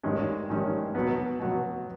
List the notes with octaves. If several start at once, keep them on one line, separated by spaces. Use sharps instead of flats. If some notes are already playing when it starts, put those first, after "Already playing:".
A1 G2 D#3 G#3 C#4
A1 G2 D#3 G#3 C#4
B2 F#3 B3
B2 F#3 B3